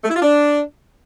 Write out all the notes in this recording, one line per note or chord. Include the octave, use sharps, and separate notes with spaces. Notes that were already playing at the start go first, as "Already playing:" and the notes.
A3
E4
F4
D4